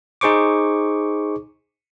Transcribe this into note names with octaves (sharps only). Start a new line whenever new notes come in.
D#4 G#4 C5 C#6 D6